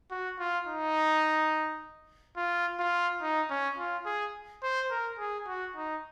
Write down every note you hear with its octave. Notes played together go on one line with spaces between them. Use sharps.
F#4
F4
D#4
F4
F4
D#4
C#4
F4
G#4
C5
A#4
G#4
F#4
D#4